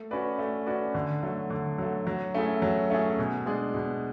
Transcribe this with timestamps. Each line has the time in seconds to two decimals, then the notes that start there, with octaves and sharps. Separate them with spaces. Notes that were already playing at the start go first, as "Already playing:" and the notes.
Already playing: A3
0.11 C#4 F#4 B4 D5
0.39 A3
0.66 C#4 F#4 B4 D5
0.95 D3
1.23 F#3 A3
1.50 D3
1.78 F#3 A3
2.07 F#3
2.34 A3 C#4 E4 G#4
2.62 F#3
2.90 A3 C#4 E4 G#4
3.18 B2
3.46 G#3 D4 G#4
3.74 B2